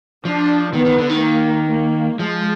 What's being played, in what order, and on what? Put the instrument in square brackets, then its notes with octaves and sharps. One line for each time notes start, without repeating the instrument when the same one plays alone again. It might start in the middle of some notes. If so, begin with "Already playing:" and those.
[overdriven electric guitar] F3 [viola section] D4
[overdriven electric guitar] D#3 [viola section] B3
[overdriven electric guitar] D#3
D3
D#3
[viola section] A#3
A#3
[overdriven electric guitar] F3 [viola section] G#3